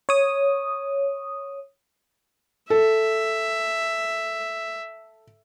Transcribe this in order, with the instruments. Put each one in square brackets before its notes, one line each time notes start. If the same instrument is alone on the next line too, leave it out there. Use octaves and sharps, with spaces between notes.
[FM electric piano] C#5 D#6
[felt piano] A4 [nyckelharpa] E5